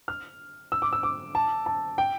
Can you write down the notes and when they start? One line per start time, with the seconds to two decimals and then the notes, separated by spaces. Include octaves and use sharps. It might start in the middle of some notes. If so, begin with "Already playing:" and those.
0.08 F6
0.72 E6
0.82 D6
0.93 E6
1.03 D6
1.35 A5
1.66 A5
1.98 G5